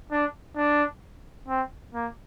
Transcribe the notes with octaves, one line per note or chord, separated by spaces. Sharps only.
D4
D4
C4
A#3